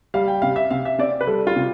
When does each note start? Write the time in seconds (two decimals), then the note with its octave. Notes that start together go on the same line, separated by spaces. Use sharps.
0.14 G3 F5
0.28 G5
0.42 C3 F5
0.56 E5
0.71 C3 F5
0.85 E5
0.99 C4 D5
1.21 B4
1.27 G3 A4
1.47 F4
1.56 C3